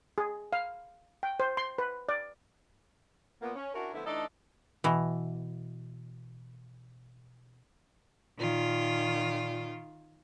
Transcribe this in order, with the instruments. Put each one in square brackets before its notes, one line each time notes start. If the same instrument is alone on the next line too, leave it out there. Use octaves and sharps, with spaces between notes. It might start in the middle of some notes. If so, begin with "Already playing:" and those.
[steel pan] G#4
F5
G5
C5
C6
B4
D5
[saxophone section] A#2 A#3 B3
C#4
C#4 D4 E4 F#4 A#4
D3 F3 A3 B3 E4
E3 A3 D4 D#4 A4 D#5
[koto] B2 E3
[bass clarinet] A#2 [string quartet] D#3 F4